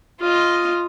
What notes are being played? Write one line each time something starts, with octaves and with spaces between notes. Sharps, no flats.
F4 D#5